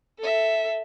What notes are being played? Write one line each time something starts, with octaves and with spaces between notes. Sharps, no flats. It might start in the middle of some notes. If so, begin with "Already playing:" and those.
A4 E5